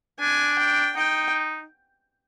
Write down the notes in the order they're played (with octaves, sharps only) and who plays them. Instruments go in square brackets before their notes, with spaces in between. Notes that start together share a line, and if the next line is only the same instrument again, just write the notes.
[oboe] D4 [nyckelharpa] G#5
[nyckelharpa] G5
[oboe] D#4 [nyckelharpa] G5